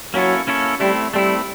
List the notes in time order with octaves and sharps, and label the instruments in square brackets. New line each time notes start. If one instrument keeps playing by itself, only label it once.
[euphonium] F#3 [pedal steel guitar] A#3 C#4 E4 A4 C#5
[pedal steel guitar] A#3 C#4 E4 A4 C#5
[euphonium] G3 [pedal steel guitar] A3 C4 E4
[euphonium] G3 [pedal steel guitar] A3 C4 E4